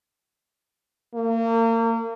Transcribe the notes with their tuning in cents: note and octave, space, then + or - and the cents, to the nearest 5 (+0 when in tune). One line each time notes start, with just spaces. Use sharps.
A#3 -35